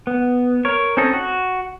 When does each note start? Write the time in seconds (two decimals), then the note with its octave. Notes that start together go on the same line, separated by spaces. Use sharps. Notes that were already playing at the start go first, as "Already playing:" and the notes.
0.07 B3
0.65 A#4 C#5
0.97 C4 C#4 D#4 A4 D#5
1.13 F#4